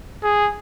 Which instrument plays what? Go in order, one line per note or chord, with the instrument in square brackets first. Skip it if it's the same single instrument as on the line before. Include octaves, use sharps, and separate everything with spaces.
[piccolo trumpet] G#4